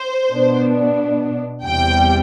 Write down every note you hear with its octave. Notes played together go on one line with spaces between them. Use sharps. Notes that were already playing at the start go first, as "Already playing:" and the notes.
Already playing: C5
B2 B3 D4
E2 C3 G3 G5